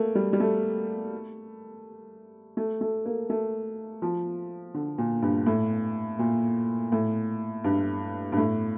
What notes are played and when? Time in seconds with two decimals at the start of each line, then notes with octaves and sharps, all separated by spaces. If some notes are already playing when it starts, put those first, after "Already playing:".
Already playing: A3 A#3
0.15 G3
0.33 G3
0.40 A3
2.57 A3
2.81 A3
3.06 A#3
3.30 A3
4.02 F3
4.74 D3
4.98 A#2
5.22 G2
5.46 A2
6.19 A#2
6.92 A2
7.64 G2
8.32 G2
8.37 A2